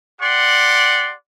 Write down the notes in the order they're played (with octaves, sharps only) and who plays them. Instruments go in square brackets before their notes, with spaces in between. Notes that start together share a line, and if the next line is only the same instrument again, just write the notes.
[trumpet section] G4 D5 F#5 C6